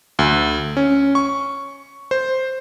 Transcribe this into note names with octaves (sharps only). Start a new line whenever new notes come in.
D2
C#4
C#6
C5